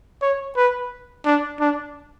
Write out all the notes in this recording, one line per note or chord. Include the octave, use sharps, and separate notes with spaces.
C#5
B4
D4
D4